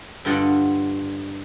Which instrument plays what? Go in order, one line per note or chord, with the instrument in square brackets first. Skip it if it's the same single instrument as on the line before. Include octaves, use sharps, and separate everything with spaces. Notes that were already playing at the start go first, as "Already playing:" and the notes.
[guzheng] G2 D3 F4 D5 D#5 F#5